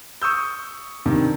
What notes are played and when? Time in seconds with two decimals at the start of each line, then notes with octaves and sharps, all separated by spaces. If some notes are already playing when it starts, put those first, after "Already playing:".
0.22 C#6 D#6 E6 G6
1.05 G2 C3 D#3